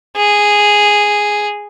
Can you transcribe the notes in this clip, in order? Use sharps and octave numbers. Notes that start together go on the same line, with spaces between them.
G#4